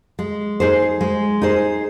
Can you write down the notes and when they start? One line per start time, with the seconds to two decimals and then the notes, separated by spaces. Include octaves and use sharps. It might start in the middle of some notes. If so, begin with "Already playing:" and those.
0.19 G#3
0.60 D#4 G#4 C5
1.01 G#3
1.42 D#4 G#4 C5